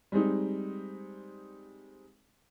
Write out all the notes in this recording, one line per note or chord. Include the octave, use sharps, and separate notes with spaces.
G3 G#3 C4 D#4